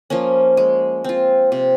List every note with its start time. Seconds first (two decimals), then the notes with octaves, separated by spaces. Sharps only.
0.10 F3 A#3 C#4
0.57 G#3
1.04 C4 F4
1.52 C3